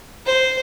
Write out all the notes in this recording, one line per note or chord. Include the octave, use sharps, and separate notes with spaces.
C5